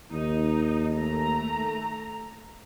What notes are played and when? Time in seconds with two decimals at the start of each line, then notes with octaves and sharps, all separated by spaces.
0.12 D#2 D#4
0.95 A3 A#5